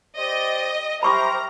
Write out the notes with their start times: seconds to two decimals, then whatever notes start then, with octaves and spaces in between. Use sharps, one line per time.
0.17 G4 C5 D5 D#5
1.03 G4 A#4 C5 E5 A#5 B5 C#6 D6